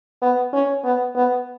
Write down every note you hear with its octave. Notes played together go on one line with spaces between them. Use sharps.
B3
C#4
B3
B3